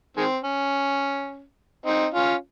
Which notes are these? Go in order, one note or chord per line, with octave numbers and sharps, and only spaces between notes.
D#3 G#3 C4
C#4
C4 D#4
C#4 F4